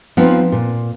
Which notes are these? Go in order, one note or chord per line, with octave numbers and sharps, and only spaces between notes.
F3 B3 C4 D#4
A#2